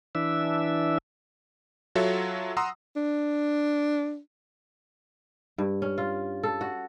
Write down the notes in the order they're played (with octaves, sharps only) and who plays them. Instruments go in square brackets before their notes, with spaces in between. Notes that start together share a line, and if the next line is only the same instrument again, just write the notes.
[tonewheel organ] E3 D4 E5
[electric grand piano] F#3 F4 F#4 A4 C#5 E5
F#5 A#5 C6 D#6 E6
[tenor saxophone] D4
[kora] G2
C#4
F4
A4
F#4